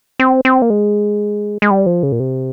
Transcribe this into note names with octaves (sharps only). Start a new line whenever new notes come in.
C4
C4
A#3
G#3
G#3
G3
F3
C#3
A#2
C3